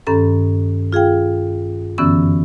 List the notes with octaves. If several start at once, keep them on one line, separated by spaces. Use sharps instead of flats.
G2 D#3 C#4 A4 A#5
F4 G#4 F5 G5
F#2 D3 E3 B3 C#4 E6